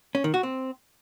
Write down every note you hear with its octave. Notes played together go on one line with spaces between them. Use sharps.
C#4
D#3
F#4
C4